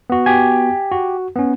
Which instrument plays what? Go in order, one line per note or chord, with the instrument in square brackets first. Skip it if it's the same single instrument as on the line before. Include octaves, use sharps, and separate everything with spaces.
[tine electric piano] B3 F#4
[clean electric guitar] G4 G#5
[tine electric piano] F#4
B3 C#4